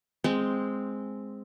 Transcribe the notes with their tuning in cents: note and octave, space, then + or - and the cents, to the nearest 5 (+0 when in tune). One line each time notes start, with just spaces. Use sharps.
G#3 +0 C4 +0 G5 -5